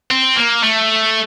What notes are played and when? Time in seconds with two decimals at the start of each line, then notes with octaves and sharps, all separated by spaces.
0.10 C4
0.37 A#3
0.63 A3